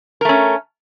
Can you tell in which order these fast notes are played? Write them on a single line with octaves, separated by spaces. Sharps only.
A#4 A3 C#4